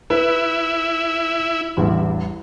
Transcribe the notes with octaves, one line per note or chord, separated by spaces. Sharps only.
E4 B4
A1 E2 G2